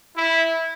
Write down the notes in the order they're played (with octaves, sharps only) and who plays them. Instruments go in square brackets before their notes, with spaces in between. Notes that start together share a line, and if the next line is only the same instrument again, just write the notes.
[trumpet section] E4